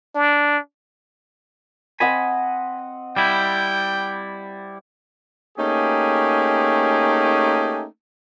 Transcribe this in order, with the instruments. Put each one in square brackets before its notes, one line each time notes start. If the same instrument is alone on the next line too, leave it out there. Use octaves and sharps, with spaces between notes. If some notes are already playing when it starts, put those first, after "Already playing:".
[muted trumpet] D4
[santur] C4 D#5 F#5 [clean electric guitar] G#5 B5
[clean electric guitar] G3 E4 [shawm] G5
[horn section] A3 A#3 C#4 D#4 G4 G#4